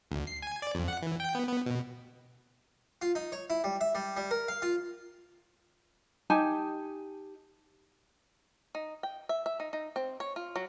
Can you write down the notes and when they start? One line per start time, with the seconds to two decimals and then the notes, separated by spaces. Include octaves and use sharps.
0.11 D2
0.27 C7
0.42 G#5
0.62 D5
0.75 F2
0.88 F#5
1.02 E3
1.20 G5
1.35 B3
1.48 B3
1.66 B2
3.02 F4
3.15 D#4
3.32 C#5
3.50 E4
3.64 G3
3.81 E5
3.95 G3
4.17 G3
4.31 A#4
4.48 F5
4.62 F4
6.30 D#4 G4 G#5 A5
8.75 D#4
9.03 G5
9.29 E5
9.46 E5
9.60 D#4
9.73 D#4
9.96 C4
10.20 C#5
10.36 F4
10.56 F#3